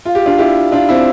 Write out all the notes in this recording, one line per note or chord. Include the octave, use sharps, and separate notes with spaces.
F4
G4
D4 F4
E4 G4
D4 F4
C4 E4